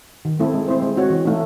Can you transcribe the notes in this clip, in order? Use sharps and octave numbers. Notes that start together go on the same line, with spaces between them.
D#3
A3 C4 E4 A4
G#3
C4 E4 C5
G#3
C4 F#4 C#5
E3
A3 D#4